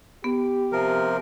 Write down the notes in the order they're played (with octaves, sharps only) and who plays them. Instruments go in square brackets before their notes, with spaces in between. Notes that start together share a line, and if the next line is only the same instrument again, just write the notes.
[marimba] B3 [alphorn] G4
[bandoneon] C3 F3 A#4